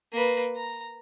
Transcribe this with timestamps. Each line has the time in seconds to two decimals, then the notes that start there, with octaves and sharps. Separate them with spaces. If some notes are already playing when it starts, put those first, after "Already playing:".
0.12 A#3 B4
0.56 A#5